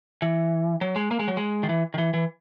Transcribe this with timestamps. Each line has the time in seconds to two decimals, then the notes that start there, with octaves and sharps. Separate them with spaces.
0.22 E3
0.81 F#3
0.96 G#3
1.11 A#3
1.19 G#3
1.28 F#3
1.37 G#3
1.63 D#3
1.69 E3
1.94 D#3
1.98 E3
2.14 E3